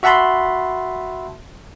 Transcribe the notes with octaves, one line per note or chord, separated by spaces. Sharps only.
F#4 E5 F#5 A5 B5 C6